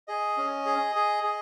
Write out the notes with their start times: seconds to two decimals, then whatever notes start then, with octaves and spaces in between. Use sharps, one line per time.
0.08 G#4 D#5
0.37 C#4
0.66 G#4
0.95 G#4
1.24 G#4